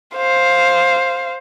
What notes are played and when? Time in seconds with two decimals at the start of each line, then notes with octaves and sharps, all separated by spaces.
0.15 C5 F5